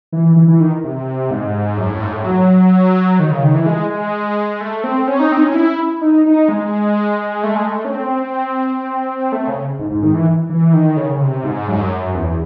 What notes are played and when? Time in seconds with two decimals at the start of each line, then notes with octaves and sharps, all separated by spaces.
0.12 E3
0.36 E3
0.48 E3
0.60 D#3
0.84 C3
1.30 G#2
1.77 F#2
1.90 A2
2.01 G#2
2.13 A2
2.24 F#3
3.19 D#3
3.31 C#3
3.43 D#3
3.54 E3
3.66 G#3
3.90 G#3
4.61 A3
4.84 C4
5.08 C#4
5.19 D#4
5.32 C4
5.37 D#4
5.43 C#4
5.54 E4
6.01 D#4
6.26 D#4
6.49 G#3
7.43 A3
7.55 G#3
7.67 A3
7.85 C#4
7.91 C4
9.32 A3
9.47 C#3
9.79 G#2
9.91 G#2
10.03 D#3
10.14 E3
10.50 E3
10.73 D#3
10.97 C#3
11.13 C#3
11.21 C3
11.44 G#2
11.68 F#2
11.74 G#2
11.81 F#2
12.15 E2